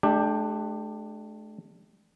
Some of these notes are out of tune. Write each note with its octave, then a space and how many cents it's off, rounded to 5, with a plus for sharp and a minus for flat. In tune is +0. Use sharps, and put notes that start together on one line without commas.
A3 -35 D4 +20 G4 +10